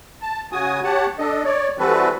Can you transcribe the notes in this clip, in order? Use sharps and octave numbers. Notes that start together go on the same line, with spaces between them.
A5
C#3 F#4 G#5 D#6
G4 C#5 F#5 A5
D4 A4 D#5
C#5 D5
E3 G3 C4 F#4 A4 B4